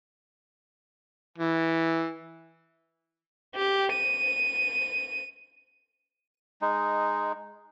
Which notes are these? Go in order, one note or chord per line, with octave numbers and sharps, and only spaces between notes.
E3
G4
D#7
G#3 D#4